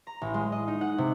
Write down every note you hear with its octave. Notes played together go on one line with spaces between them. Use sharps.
A#5
A1
G#3
D#5
D#4
F#5
C3